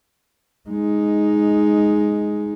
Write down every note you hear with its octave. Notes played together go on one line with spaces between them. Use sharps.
G#3 D#4